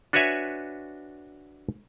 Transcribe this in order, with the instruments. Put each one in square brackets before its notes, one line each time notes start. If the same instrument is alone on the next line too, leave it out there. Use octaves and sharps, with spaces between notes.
[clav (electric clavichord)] D4 F#4 B4 C#5 E5 G#5